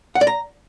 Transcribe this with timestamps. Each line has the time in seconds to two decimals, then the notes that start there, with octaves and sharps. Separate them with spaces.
0.15 F#5
0.21 D5
0.27 A#5